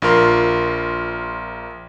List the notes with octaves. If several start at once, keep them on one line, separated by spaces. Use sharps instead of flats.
A#1 F4 A#4 C6